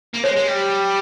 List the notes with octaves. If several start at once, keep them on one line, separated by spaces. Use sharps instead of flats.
A#3
G#3 C#5
G#3
G3